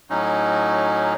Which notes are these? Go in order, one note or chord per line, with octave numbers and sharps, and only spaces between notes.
A2 F#3 C#4 D#4